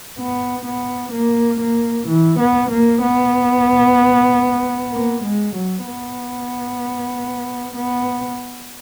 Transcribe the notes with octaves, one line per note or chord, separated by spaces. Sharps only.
B3
B3
A#3
A#3
E3
B3
A#3
B3
A#3
G#3
F#3
B3
B3